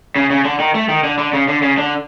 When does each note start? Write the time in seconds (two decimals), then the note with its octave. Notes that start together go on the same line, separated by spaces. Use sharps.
0.16 C#3
0.30 C#3
0.45 D3
0.60 D#3
0.75 A3
0.89 D#3
1.04 D3
1.19 D3
1.33 C#3
1.48 D3
1.62 C#3
1.78 D3